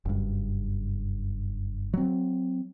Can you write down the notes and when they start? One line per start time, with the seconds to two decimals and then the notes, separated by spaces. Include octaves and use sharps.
0.05 F#1 G2
1.93 F#3 C4